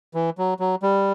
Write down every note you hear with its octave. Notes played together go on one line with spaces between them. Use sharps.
E3
F#3
F#3
G3